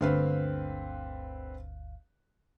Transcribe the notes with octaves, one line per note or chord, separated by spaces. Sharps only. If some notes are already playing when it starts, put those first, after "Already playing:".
G1 D2 D3 C4 B4 F5